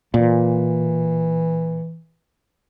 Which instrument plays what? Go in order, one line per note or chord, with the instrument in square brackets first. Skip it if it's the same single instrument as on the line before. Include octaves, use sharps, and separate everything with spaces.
[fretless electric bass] A#2 [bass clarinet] E3